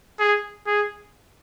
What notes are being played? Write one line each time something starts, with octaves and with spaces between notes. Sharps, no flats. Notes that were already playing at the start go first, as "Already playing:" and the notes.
G#4
G#4